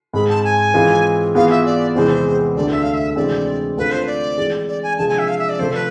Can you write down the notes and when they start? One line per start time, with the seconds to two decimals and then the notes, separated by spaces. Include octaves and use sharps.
0.13 G#2 G#3 C4 G#4 B5
0.29 A5
0.44 G#5
0.74 E3 G#3 C4 F4
1.35 E3 B3 F4 G#4 F5
1.50 E5
1.66 D5
1.95 E2 C3 E3 G#3 C4 C5
2.56 D2 D3 A3 D5
2.72 E5
2.83 F5
2.94 E5
3.16 D2 C3 E3 G#3 C4 D5
3.77 D3 A3 C4 F4 A4 B4
3.92 C5
4.07 D5
4.37 E3 G#3 C4 G#4
4.68 D5
4.83 G#5
4.98 C3 F3 G#3 D4 G#4 A5
5.08 G#5
5.19 E5
5.28 F5
5.39 E5
5.49 D5
5.59 C3 F3 A3 C5
5.74 B4